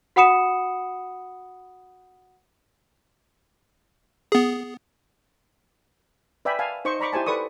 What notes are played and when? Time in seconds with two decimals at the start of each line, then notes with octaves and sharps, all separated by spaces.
0.16 F#4 F#5 B5 D#6 C#7 E7
4.32 B3 G#4
6.45 B4 D5 E5 G5 G#5 B5
6.59 F5 G#5 A5
6.85 D#4 C5 D#5 C#6
7.00 D5 A#5 B5 C#6 D6
7.13 E4 G4 C5 G#5 A5
7.27 A4 B4 D5 C#6 D#6